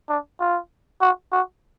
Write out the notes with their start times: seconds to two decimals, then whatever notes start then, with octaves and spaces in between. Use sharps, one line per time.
0.09 D4
0.40 F4
1.01 F#4
1.32 F#4